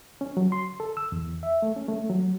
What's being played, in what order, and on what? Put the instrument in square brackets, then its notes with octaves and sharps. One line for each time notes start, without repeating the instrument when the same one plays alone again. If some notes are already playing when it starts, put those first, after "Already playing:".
[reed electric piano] C#4
F#3
C6
A4
E6
E2
E5
A3
C#4
A3
F#3